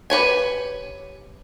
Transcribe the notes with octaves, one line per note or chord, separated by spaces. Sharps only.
G4 B4 C#5 G#5